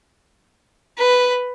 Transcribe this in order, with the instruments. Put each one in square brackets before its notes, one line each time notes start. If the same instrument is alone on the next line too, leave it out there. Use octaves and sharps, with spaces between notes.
[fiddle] B4